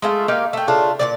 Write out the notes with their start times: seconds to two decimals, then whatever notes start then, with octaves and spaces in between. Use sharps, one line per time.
0.02 G#3 A3 F4
0.28 A#3 D#4 G4 F5
0.53 A3 G5
0.68 C#3 A3 D4 F4
0.99 A#2 F#3 D5